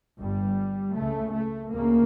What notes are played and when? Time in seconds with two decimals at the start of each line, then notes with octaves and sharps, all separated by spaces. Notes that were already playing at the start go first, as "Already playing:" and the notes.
0.21 G1 G2 G3
0.97 C#2 C#3 A3
1.36 A3
1.74 D2 C#3 A#3